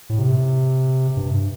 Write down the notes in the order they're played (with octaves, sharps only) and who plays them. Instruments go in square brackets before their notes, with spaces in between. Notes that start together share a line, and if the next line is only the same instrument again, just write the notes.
[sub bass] A2
C3
G2